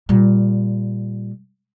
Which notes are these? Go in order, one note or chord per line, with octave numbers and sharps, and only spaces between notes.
A#2 G3